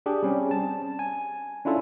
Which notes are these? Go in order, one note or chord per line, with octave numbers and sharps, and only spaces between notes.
D4 G4 G#4
G3 C4 C#4
A5
G#5
C#4 D4 E4 F4 A4